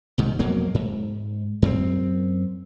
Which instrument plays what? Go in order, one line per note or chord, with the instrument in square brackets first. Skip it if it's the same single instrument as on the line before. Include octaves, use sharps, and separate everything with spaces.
[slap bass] C2 G#2 D#3
F2 B2 F#3 A#3
G#2
F#2 C4